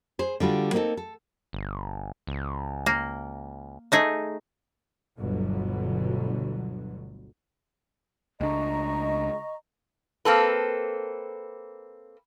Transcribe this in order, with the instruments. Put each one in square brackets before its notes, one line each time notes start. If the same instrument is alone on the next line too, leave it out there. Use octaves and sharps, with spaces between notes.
[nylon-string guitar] G#4 C5
D3 G3 F4 F#4
A#3 C4 D#4 G#4 A4
A4
[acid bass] G1
C#2
[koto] A#3
A3 D#4 G#4
[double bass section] G1 D2 G2 B2 D3 F#3
[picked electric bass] C#2 D4 [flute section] D#5 A#5 C#6
[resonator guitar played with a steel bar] A#3 C4 A4 B4